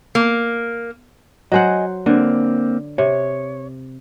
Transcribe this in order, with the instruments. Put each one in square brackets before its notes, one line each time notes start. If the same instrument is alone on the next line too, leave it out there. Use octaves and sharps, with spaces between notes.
[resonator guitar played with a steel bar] A#3
[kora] F#3 C5 F#5 [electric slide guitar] D#5 G#5
[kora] D3 [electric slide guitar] A#3 C4
[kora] C3 [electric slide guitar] C#5